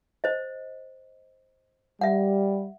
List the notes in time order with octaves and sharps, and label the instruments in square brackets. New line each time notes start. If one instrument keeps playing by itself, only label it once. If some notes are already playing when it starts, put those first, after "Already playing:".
[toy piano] C5 D#5
[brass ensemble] G3 [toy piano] E5 F#5